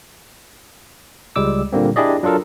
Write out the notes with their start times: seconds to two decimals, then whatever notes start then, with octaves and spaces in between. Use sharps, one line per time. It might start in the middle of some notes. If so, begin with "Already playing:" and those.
1.36 C#2 G3 G#3 D6 E6
1.73 A#2 D3 G3 A#3 C4
1.96 D4 E4 G4 G#4 D5 D#5
2.23 F#3 D4 F4 A4 A#4